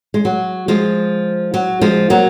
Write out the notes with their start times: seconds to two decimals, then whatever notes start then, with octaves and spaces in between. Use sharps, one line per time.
0.14 G#3
0.25 F#3
0.68 F3 G#3
1.54 F#3
1.81 F3 G#3
2.10 F#3 A#3